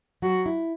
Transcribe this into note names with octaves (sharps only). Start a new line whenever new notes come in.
F#3 F#4
E4